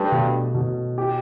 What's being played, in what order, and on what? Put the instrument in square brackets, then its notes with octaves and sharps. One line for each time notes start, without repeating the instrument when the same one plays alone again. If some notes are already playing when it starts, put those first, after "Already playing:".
Already playing: [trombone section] G2 [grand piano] A3
[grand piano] B2
B2
G4